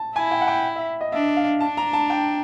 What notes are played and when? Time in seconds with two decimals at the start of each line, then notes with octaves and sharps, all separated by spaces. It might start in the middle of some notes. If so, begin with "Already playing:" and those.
Already playing: A5
0.16 E4 G#5
0.31 G5
0.41 F#5
0.48 G5
0.76 E5
1.01 D#5
1.12 D4 E5
1.36 F5
1.61 D4 A5
1.77 A#5
1.93 A5
2.10 G5